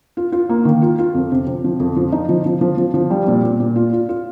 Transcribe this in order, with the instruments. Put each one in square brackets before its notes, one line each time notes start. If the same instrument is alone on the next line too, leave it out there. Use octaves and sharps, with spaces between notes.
[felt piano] F4
F4
A#3
D#3
F4
F4
F2
C3
C3
F3
F2
F3
D#4
F3
F3
F3
F3
F3
G3
A#2
A#2
A#2
F4
F4
F4